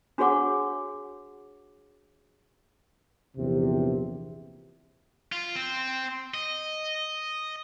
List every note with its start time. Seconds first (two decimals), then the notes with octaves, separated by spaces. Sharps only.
0.18 D4 F#4 G#4 C#5 F#5 D6
3.37 A#1 E2 C3
5.32 F4
5.56 C4
6.34 D#5